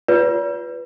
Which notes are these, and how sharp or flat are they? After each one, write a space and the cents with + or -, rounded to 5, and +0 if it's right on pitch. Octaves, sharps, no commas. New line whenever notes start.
F4 +0 B4 +0 D5 -40